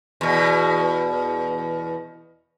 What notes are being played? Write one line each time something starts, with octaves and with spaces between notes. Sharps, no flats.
E2 B2